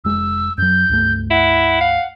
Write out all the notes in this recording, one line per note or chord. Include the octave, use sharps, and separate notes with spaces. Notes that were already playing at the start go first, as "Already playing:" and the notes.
F1 G#3 E6
F#2 F#3 G6
C#2 G2 A3
E4 F#5
F5